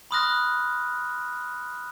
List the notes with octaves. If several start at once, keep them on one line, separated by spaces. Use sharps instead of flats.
B5 C6 D#6 F6 F#6 A#6